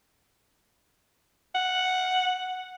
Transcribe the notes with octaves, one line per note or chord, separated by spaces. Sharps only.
F#5